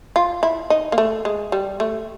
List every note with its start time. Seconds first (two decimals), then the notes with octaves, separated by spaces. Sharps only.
0.16 F4
0.43 E4
0.70 D#4
0.92 A#3
0.98 A3
1.25 G#3
1.52 G3
1.80 A3